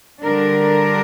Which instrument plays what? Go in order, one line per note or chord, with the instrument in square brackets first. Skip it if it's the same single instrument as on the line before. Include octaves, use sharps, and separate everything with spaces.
[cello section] D3 G3 D4 A#4